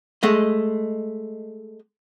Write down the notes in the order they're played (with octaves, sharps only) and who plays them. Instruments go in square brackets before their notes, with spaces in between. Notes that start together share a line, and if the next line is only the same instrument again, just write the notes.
[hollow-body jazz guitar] G#3 A3 D#5